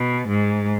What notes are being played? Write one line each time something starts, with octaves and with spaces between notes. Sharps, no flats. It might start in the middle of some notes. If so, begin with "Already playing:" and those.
Already playing: B2
G#2